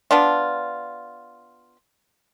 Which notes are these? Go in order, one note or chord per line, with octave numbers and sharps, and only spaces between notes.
B3 D4 F4